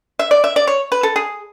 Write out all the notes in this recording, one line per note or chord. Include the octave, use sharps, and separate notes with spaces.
E5
D5
E5
D5
C#5
B4
A4
G#4